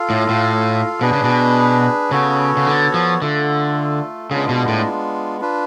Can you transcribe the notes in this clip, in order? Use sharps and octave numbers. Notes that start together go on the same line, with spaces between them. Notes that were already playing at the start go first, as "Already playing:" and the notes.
Already playing: F4 A4 F5
A2
A2
B2 D4 G#4 B4
C#3
B2
C#3 B3 F#4 A4 C#5
C#3
D3
F3
D3 A3 F4 A4
C#3 G#3 B3 D4 F4
B2
A2
D4 F4 B4